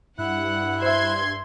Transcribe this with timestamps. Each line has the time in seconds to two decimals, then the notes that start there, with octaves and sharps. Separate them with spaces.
0.19 G2 E4 F#5 F#6
0.82 C5 E5 C6 G#6